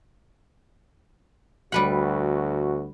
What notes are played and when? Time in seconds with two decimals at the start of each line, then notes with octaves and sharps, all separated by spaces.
1.72 D2 G3 F#4 B4 F#5